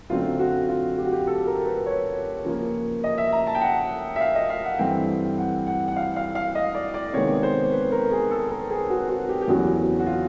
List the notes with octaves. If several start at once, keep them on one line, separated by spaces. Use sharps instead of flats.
F#2 D3 F#3 A3 C4 F4
F#4
F4
G4
F#4
G4
A4
A#4
B4
C#5
C#3 F3 A#3
D#5
E5
A#5
A5
G5
F#5
E5
F5
D#5
F5
F#5
G2 E3 A3 C4 G5
F#5
F#5
F#5
F5
F5
F5
D#5
D5
D5
C3 D#3 G#3 B3 C#5
C5
B4
A#4
G#4
A4
A#4
G#4
F#4
F#4
G4
G4
E2 C#3 F#3 A3 C#4 F#4
F#4
F4